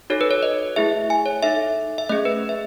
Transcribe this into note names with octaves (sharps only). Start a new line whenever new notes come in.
D#4 F#4 A4 C#5
B4
C#5
D#5
A3 E4 G#4 E5
G#5
C#5
D#4 A4 E5
E5
A3 C#4 G#4 D#5
B4
E5